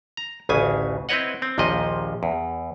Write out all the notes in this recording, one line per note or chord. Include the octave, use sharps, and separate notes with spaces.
A#5
A1 D2 C#3 G#5
C4 E4 B4 C#5 D#5 F#5
C4
A#1 D#2 A#2 F3 D#5
E2